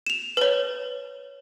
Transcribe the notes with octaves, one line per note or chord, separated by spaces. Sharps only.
E7 F7
B4 C#5